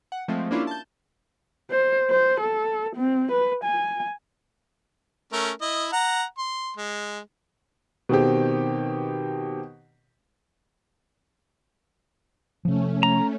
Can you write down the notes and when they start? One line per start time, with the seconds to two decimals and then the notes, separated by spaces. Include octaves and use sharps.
0.12 F#5
0.28 F3 G#3 A3 C4
0.51 A#3 C#4 D4 E4 F4 G4
0.67 A5 G6
1.70 C5
2.10 C5
2.41 A4
2.96 C4
3.32 B4
3.64 G#5
5.33 A3 C#4 A#4
5.62 E4 D#5
5.93 F#5 A#5
6.38 C6
6.77 G#3
8.09 B2 D#3 C4 G4
12.65 C3 F3 A3 C#4
13.03 A#5